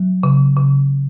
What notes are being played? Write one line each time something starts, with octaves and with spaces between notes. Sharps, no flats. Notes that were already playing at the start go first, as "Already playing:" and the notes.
Already playing: F#3
C#3
C#3